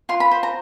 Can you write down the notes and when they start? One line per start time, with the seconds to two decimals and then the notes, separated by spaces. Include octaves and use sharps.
0.09 F4 C6
0.20 B5
0.31 C5 B5
0.43 A#5